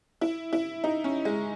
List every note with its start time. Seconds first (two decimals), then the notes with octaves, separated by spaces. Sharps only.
0.21 E4
0.53 E4
0.84 D#4
1.04 C#4
1.25 G#3